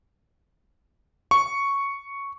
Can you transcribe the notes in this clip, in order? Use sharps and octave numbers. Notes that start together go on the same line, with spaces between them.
C#6